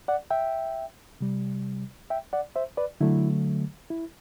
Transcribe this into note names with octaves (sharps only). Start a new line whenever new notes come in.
D5 F#5
E5 G5
C3 G3
E5 G5
D5 F#5
C5 E5
B4 D5
D3 F#3 A3 E4
E4